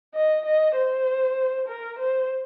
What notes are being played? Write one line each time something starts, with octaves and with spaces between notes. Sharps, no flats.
D#5
D#5
C5
A#4
C5